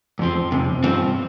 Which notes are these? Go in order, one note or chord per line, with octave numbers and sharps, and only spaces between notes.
F2 F3 C4
F2 C3
G2 F3 C4